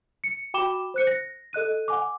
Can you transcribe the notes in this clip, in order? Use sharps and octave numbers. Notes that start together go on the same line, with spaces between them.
C#7
F#4 G5 B5 D6 E7 G7
C5 F#6 C#7
A#6
A4 D#5 F#6 D#7
F#5 G#5 D6